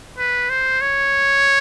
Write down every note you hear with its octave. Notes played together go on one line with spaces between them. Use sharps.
B4
C5
C#5